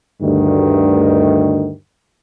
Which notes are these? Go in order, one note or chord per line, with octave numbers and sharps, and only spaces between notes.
D2 G2 D#3